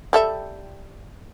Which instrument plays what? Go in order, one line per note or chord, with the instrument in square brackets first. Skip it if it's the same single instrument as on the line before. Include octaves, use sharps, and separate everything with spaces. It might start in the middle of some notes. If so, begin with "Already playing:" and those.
[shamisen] G3 A4 E5